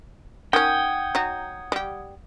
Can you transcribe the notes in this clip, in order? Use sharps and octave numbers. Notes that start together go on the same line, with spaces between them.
D#3 C#4 F#5 G5 D#6 G#6
F#3 D#4
G3 G4